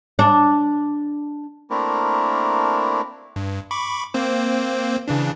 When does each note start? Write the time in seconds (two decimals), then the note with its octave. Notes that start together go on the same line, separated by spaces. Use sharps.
0.19 D4
1.70 A3 A#3 C4 D4 E4 A#4
3.36 G2
3.71 B5 C#6 D6
4.14 A#3 C4 C5
5.08 C#3 E3 D4